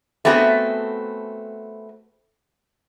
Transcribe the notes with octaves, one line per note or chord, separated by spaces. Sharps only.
A3 B3 C4 F#4 G#4